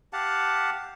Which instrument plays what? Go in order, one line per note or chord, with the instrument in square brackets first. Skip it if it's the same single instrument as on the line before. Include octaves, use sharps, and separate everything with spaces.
[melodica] G4 F5 F#5 A5